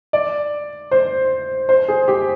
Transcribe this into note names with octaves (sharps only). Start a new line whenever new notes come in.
D5
C5
C5
G#4
G4